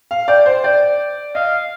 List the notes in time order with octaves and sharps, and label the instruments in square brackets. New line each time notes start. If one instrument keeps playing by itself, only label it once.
[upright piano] F5
[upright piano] D5 [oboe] G5
[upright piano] C5
[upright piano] D5 [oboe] G5
[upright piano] D#5 [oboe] F5